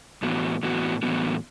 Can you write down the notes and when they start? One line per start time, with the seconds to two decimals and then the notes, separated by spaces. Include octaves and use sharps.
0.22 A2 E3 B3 F#4
0.63 A2 E3 B3 F#4
1.03 A2 E3 B3 F#4